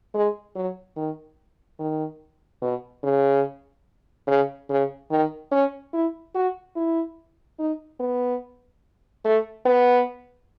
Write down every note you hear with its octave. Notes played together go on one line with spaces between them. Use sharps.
G#3
F#3
D#3
D#3
B2
C#3
C#3
C#3
D#3
C#4
E4
F#4
E4
D#4
B3
A3
B3